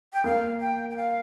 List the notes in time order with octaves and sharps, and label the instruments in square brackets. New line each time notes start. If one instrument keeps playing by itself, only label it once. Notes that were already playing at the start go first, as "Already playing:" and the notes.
[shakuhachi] G5
[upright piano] A#3 [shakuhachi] F5
[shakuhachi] G5
G5
F5